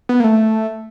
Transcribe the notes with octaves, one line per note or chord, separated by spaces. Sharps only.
B3
A#3
A3